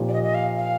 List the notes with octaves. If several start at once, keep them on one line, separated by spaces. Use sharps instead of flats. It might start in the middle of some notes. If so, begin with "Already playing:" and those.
Already playing: A#2 F3 C4 D#4 G4
D5
D#5
D#5
F5
F5